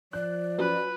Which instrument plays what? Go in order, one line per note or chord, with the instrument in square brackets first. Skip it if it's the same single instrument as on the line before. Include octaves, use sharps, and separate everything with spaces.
[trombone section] F3 [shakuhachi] D5 [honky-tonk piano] F#6
[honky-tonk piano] F#3 C#4 F4 [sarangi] B4